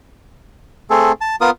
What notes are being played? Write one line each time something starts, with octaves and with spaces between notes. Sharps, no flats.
A3 C4 G#4 A4
A5
B3 F4 A#4 D#6